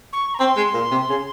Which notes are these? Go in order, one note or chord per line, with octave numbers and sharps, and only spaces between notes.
C#6
A#5
C4 C6
G#3
A#2
C3
C#3